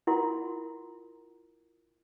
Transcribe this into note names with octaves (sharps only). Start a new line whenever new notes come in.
E4 F4 A#4 F#5 C6